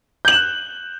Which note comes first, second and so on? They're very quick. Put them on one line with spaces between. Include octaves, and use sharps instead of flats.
G6 F#7 E7 F#6